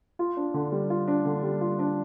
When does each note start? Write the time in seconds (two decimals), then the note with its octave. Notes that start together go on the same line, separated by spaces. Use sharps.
0.19 F4
0.37 D4
0.54 D3
0.72 G3
0.90 F4
1.08 D4
1.25 D3
1.43 G3
1.61 F4
1.79 D4